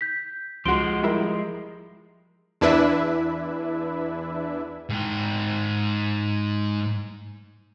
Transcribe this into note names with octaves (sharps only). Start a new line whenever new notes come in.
G6 B6
C#2 F3 G#3 F#4 C6 D7 G7
G3 E4 A#4
E2 D4 E4 B4 E5
G#2 G5